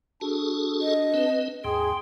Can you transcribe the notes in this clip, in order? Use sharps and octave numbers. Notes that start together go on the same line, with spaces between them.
D4 F#4 G#4 A4
D#5
C4 B4
D#2 G#2 G#4 G5 C6